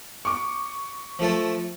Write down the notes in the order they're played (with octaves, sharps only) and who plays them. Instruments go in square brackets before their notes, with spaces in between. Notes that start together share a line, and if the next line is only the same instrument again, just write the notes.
[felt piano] C#6 D6
[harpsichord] F3 A3 A4